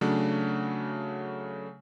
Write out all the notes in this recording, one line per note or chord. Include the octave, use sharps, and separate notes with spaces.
C#3 F#3 A3 D4